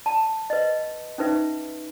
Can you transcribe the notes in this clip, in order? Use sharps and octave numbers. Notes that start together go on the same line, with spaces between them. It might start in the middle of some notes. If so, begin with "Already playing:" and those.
A5
B4 D#5
C#4 D#4 B4 E5